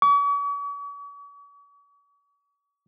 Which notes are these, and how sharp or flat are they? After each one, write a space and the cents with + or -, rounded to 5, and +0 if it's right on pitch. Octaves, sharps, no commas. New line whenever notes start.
C#6 +45